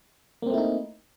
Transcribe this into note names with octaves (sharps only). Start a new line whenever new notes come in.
A3 A#3 C4 D#4 E4